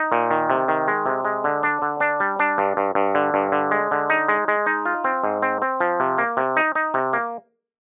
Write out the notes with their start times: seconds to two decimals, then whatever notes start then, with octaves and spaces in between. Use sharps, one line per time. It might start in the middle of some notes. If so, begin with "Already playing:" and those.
Already playing: D#4
0.12 A#2
0.31 D#3
0.50 C3
0.68 D#3
0.88 G#3
1.06 C3
1.25 G#3
1.44 D3
1.63 D4
1.82 D3
2.00 D4
2.20 G3
2.40 D4
2.58 G2
2.77 G2
2.95 G2
3.15 D3
3.34 G2
3.52 D3
3.71 G#3
3.91 D3
4.10 D#4
4.28 G#3
4.48 G#3
4.66 D#4
4.85 F4
5.04 C4
5.24 G#2
5.42 C4
5.62 C4
5.80 F3
6.00 C3
6.18 A#3
6.37 C3
6.57 D#4
6.75 D#4
6.94 C3
7.13 A#3